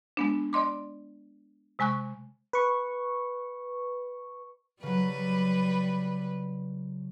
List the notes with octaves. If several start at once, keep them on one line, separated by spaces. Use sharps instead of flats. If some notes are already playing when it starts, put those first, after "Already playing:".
G#3 B3 D4
D5 D#5 C6 D6
C3 G#3 G#5 C#6 F#6
B4 C#6
C#3 F#3 G3 B4